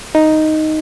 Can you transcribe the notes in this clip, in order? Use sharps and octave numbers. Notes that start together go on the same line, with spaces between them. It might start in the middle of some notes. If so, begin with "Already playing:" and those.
D#4